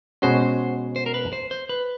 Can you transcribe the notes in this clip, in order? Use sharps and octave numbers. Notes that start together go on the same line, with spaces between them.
B2 G#3 C#4 F#4 C5
C5
A#4
B4
C5
C5
B4